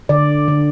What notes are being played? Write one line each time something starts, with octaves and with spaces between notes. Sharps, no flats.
D3 D5
D3